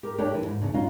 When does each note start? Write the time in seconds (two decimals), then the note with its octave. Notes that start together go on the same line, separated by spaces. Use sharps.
0.03 G4 A#4
0.18 A3 D4 G4 A#4 C#5 G5
0.35 D#2 E3
0.46 G#2
0.62 E2 A#2 C#3
0.74 C#4 D#4 F4 F#4